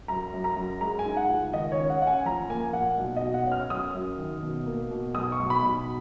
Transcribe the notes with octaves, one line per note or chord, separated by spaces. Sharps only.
F#2 A#5
F#2
A#5
F#2
G#3 A#5
G#5
D#4
F#5
C#2
D#3 D#5
C#5
C#4
F#5
C#4 F#5
G#5
F3 A#5
A#3 G#5
A#2 F#5
B1
D#5
B2
F#5
C#4
F6
F#2 D#6
F#2
D#3
B2
A#3
B2
B1 D#6
C#6
B1
B5
B1